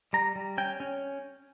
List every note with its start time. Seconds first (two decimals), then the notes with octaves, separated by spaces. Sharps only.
0.13 G3 A#5
0.36 G3
0.58 C#4 G5
0.80 C#4